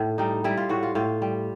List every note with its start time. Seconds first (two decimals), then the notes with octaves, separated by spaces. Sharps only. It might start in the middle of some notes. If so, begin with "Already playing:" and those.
Already playing: A2
0.18 G3 D#4
0.44 G3 E4
0.57 F4
0.69 A2 F#4
0.83 F4
0.95 A2 F4
1.22 G3